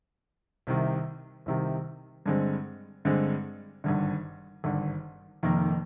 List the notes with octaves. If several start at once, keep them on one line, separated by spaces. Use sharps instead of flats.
C2 C3 D#3
C2 C3 D#3
G2 D3 G#3 C4
G2 D3 G#3 C4
G#1 G2 D3
G#1 G2 D3
F1 F2 D#3 A#3